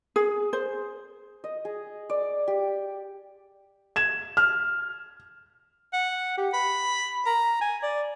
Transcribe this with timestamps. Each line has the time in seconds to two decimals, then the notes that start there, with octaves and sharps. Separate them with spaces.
0.16 G#4
0.53 C5
1.44 D#5
1.65 G#4
2.10 D5
2.48 G4
3.96 G#6 E7
4.37 F6
5.93 F#5
6.38 G4
6.53 B5
7.26 A#5
7.61 G#5
7.83 D5